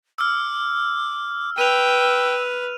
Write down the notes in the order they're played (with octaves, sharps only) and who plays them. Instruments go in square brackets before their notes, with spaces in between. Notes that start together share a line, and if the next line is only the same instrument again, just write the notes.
[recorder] D6 [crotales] E6 F6
[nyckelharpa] B4 [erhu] G5 [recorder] E6 [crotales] D#7 F7